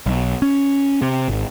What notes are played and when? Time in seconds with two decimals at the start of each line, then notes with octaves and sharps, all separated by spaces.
0.06 B1
0.42 C#4
1.02 C3
1.28 G#1